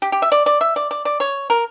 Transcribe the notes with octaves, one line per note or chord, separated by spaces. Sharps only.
G4
G4
E5
D5
D5
E5
D5
D5
D5
C#5
A#4